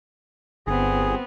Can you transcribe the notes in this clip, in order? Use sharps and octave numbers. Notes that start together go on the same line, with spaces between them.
G1 B3 C4 G#4